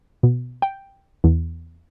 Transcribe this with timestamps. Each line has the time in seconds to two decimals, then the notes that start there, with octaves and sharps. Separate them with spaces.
0.23 B2
0.62 G5
1.24 E2